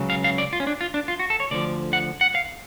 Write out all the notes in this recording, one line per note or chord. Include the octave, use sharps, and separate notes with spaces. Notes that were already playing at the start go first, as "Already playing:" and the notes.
Already playing: C#2 C#3 F#3
F5
F5
D5
F4
C#4
D4
F4
D4
F4
F#4
A4
C#5
D2 D3 F3 D5
F#5
F#5
F5